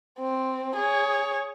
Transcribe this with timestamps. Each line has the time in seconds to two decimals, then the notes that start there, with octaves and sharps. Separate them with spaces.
0.19 C4
0.76 G#4 C#5